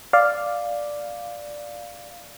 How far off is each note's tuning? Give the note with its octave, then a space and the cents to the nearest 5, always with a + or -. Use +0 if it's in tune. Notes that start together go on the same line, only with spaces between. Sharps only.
D5 +0 F5 +0